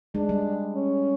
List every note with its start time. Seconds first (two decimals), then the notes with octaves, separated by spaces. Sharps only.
0.15 G#3 D4
0.29 G3
0.75 C#4